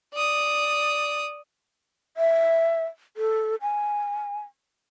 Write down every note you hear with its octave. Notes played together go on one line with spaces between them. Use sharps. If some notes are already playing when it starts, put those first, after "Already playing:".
D5 D#6
E5
A4
G#5